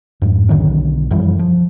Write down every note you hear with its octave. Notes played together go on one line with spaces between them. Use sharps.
F2 G#2
B1 D3 D#3 C#4
F#2 E3 F3 G3
F3